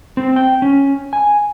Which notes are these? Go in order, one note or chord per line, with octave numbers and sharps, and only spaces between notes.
C4
G5
C#4
G#5